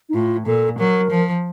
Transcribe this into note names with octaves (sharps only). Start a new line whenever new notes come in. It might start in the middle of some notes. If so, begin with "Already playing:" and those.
D#4
A2 F4
A#2 A4
F#3 A#4
F3